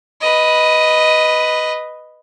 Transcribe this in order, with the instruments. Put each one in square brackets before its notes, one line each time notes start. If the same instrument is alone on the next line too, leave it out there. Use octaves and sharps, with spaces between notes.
[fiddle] B4 D#5